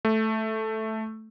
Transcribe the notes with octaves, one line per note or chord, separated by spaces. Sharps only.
A3